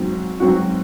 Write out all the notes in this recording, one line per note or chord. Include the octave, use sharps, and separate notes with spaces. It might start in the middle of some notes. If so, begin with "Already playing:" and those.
Already playing: G#2 F#3 C4 F#4
G#2 F#3 C4 F#4